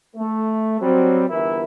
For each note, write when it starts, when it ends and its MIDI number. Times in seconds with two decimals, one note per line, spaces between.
0.16 0.77 57
0.81 1.26 54
0.81 1.26 55
0.81 1.26 60
1.29 1.63 31
1.29 1.63 40
1.29 1.63 52
1.29 1.63 64
1.29 1.63 70
1.29 1.63 76